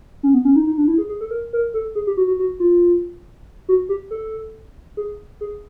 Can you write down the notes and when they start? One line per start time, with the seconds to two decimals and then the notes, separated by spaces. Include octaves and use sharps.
0.23 C#4
0.34 B3
0.45 C#4
0.56 D#4
0.67 D#4
0.78 D4
0.88 E4
0.98 G#4
1.09 G#4
1.21 A4
1.31 A#4
1.53 A#4
1.74 A4
1.95 G#4
2.07 G4
2.17 F#4
2.27 F#4
2.39 F#4
2.60 F4
3.69 F#4
3.89 G4
4.11 A4
4.97 G#4
5.41 G#4